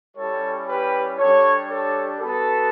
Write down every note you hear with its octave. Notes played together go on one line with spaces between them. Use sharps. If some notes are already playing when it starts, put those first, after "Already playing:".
G3 C#4 E4 G4 A4 C#5
G4 B4
G3 D4 G4 A4 C#5
A4 C#5
B3 F#4 A4